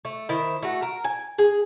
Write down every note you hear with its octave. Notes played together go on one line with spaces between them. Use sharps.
A3
D#3 E4 C5
A3 F#4
A#4
G#5
G#4